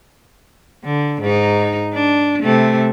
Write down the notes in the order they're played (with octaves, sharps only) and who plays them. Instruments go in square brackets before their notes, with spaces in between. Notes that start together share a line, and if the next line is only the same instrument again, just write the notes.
[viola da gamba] D3
G#2 D#4
D4
C3 A3